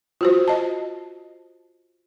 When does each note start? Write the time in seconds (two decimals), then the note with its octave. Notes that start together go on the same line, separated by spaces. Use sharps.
0.21 F4 F#4 C5
0.48 D#5 A5